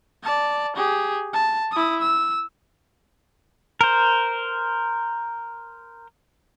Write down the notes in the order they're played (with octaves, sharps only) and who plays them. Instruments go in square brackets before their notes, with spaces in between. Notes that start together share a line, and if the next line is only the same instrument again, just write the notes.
[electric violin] D5 A5
G4 G#4
A5
E4 D#6
E6
[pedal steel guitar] A#4 C5